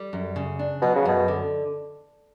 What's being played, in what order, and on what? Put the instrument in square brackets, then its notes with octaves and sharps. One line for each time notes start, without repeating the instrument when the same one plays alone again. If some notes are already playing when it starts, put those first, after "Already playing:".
Already playing: [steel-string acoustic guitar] G3
F#2
C#3
D4
[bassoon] B2 [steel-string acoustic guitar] F#3
[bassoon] C#3
[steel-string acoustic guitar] F#2 [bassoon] B2
[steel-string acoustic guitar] D3